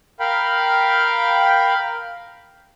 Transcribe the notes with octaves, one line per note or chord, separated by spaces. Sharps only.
A#4 F5 G5 B5